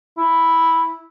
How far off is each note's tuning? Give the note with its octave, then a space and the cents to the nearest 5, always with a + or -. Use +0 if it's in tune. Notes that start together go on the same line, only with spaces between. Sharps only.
E4 -5